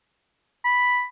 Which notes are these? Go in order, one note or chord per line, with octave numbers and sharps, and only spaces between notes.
B5